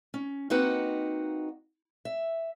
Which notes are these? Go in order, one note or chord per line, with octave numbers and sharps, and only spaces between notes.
C#4
A#3 C4 D#4 F#4 B4 F#5
E5